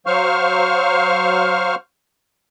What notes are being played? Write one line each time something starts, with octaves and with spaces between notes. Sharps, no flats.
F#3 C5 F5 C#6 F6